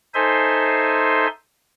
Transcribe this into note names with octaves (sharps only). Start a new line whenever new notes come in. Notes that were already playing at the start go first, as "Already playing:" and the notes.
D#4 A4 C5 E5 G#5 C6